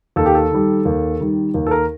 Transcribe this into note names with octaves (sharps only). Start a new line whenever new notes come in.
D#2 A4
G4
A4
D#3 G3
D#2
D#3 G3
D#2
A4
A#4